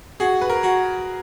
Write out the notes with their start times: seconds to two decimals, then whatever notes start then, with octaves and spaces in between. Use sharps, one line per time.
0.20 F#4 G#4
0.41 B4
0.50 A#4
0.63 F#4